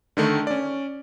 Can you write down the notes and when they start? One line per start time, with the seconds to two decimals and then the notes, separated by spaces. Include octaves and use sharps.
0.17 D3 D#3 A3
0.47 C#4 D5